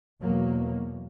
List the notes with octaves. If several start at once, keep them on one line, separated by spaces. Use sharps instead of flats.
E2 B2 F#3 A#3